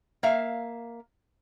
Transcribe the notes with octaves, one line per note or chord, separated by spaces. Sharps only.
A#3 E5 F5